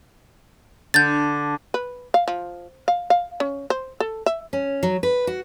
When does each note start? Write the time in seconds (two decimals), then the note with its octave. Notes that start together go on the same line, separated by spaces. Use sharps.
0.94 D3 G6 A6
1.74 B4
2.14 F5
2.28 F3
2.88 F5
3.10 F5
3.40 C#4
3.70 C5
4.00 A4
4.26 E5
4.53 C#4
4.83 F#3
5.03 B4
5.27 F#4